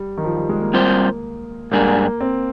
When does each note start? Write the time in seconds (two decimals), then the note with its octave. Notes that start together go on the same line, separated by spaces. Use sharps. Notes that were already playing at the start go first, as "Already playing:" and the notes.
Already playing: G3
0.18 D#3
0.25 F3
0.37 G3
0.49 G#3
0.62 A#3
0.74 G3 C4 F4 C5
1.72 G#2 G3 A#3 D4 G#4
2.21 C4